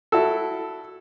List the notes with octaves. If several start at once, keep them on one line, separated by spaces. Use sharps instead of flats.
E4 F#4 A4